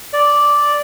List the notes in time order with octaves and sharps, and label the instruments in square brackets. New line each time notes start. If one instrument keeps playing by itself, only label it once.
[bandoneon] D5